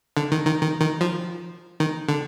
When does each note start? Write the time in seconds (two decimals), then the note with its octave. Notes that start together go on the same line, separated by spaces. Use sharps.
0.17 D3
0.32 D#3
0.47 D#3
0.62 D#3
0.81 D#3
1.01 F3
1.80 D#3
2.08 D3